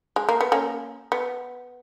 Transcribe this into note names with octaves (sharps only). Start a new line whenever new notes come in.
G#3
A#3
B3
A#3 C#4
B3